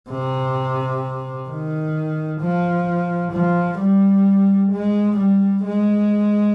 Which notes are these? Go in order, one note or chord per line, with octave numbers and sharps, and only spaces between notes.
C3
D#3
F3
F3
G3
G#3
G3
G#3